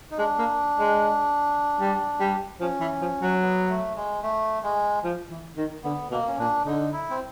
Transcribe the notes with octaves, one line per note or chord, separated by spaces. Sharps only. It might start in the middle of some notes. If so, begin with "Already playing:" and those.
D#4
G#3 D4
A#3
G#3
G3
G3
F3 C#4
E3
F3
F#3
B3
A3
G#3
A3
G#3
F3
E3
D#3
D3 B3
B2 A#3
C#4
A#2 D4
D3 D#4
E4
C4